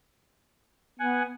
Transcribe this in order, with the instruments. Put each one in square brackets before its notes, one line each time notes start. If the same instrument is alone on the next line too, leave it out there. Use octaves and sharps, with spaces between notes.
[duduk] B3 [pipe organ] F#5 G#5